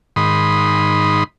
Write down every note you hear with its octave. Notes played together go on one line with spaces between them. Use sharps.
G#2 D#3 B5 C6 D#6